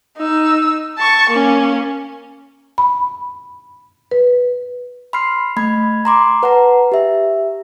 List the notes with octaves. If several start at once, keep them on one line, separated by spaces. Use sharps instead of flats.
D#4 E6
A5 C#6
A#3 C#4
B5
B4
B5 C6 F6 C7
A3 B5 G#6
A#5 C6 D6
B4 F#5 A5 A#5
G4 E5